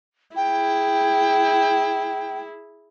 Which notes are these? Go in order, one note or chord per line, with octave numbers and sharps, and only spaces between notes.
E4 G#4 G5